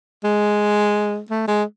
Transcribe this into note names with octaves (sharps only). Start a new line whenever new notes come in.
G#3
A3
G#3